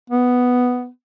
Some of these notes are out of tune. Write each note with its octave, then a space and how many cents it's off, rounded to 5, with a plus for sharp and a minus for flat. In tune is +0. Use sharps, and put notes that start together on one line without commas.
B3 +5